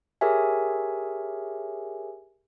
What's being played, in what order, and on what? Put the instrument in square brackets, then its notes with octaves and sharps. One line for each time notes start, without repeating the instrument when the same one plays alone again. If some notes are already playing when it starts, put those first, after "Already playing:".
[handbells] G4 G#4 A#4 C#5 E5 G#5